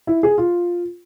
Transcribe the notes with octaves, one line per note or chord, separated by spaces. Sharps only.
E4
G#4
F4